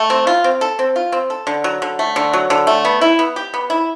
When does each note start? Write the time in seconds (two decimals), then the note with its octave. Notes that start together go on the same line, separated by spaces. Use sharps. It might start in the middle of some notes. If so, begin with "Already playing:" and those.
Already playing: A3
0.10 C4
0.27 F4
0.44 C4
0.61 A4
0.79 C4
0.96 F4
1.12 C4
1.30 A4
1.47 D3
1.64 F#3
1.82 D3
1.99 A3
2.16 D3
2.33 F#3
2.50 D3
2.67 A3
2.85 B3
3.01 E4
3.19 B3
3.36 G4
3.54 B3
3.70 E4